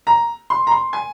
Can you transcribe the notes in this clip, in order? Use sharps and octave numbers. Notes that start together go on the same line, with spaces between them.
A#5
C6
A#5
C6
G#5